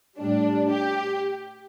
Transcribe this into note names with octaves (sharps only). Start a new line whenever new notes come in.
A2 G3 D4
G4